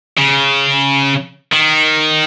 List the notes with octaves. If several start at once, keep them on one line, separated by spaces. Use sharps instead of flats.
C#3
D#3